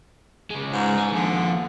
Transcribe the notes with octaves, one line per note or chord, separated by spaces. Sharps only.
C#3 G#3
G#2
B3 G#5
D#2 D3 F3